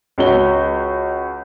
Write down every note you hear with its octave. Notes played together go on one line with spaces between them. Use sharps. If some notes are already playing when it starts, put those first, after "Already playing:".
C#2 C#4 F#4 G7